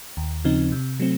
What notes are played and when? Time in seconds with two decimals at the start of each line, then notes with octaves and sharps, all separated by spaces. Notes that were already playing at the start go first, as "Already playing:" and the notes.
0.17 D#2
0.44 C#3 F3 C4 D#4
0.72 C3
1.00 F#3 A3 C4